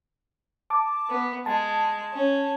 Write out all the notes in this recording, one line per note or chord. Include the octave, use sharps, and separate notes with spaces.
A5 D6
B3
G#3 A5
C#4